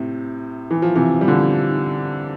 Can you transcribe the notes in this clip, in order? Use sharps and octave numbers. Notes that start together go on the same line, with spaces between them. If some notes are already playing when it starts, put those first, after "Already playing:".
Already playing: A2 C3
E3
F3
C3 E3
G3
D3 F3